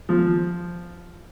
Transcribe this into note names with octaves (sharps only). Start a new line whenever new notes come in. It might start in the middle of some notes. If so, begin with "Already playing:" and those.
F3